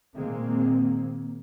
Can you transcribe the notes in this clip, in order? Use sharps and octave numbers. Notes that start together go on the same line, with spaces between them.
A#2 D#3 G#3 A#3 C4